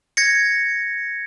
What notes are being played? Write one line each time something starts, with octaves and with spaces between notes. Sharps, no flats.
G#6 A#6 C#7